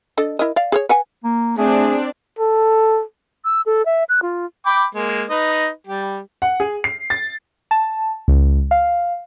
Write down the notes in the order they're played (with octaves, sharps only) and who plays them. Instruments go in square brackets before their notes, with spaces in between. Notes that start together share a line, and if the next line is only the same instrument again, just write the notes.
[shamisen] D4 A4 D#5
E4 A#4 D#5
D5 F5
G#4 A#4 C#5
B4 F#5 G#5
[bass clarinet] A#3
[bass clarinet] A3 [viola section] C4 D4 [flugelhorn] G#4
[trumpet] A4
[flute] E6
A4
E5
F#6
F4
[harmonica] G5 B5 D6
G#3 A#3
D#4 B4 D#5
G3 G4
[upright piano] F#5
G#4
C7
A6
[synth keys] A5
C#2
F5